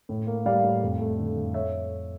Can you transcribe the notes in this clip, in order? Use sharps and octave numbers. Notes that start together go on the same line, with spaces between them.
A2
A#3
G3 D5 F5
A2
F2
A3
D3
F2
C#5 E5